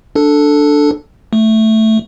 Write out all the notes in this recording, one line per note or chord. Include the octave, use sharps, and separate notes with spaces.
D4 A4
A3